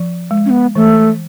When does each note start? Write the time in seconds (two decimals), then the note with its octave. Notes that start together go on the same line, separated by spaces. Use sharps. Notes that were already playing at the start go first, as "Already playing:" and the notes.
Already playing: F3
0.31 G#3
0.46 C#4
0.50 B3
0.75 E3 A3